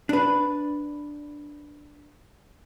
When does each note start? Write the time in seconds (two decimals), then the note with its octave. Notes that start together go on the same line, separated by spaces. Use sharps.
0.09 D4 B4